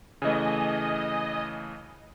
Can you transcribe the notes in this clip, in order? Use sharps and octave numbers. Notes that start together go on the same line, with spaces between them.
C#3 E3 A3 D#5 G#5